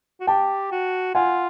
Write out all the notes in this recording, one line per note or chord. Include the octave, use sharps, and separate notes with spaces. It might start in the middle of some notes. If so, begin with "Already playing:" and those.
F#4
G4 G5 A5
F#4
F4 F#5 G#5